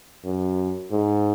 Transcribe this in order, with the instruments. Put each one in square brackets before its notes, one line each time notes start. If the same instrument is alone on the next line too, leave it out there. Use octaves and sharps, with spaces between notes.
[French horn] F#2
G#2